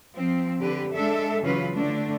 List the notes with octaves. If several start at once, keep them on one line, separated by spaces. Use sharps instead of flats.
F3 C4
D3 G4 B4
G#3 D4 A4 E5
C#3 E3 F#3 C#4 F4 B4
D3 A3 D4